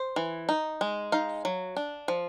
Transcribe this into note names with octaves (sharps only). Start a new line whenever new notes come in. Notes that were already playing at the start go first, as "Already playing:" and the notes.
Already playing: C5
E3
D#4
G#3
D#4 F5
F#3
D4
F3